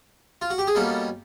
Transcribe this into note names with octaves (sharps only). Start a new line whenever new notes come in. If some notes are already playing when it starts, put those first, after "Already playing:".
F4
F#4
G4
G#4
B2 G3 A#3 C#4 A4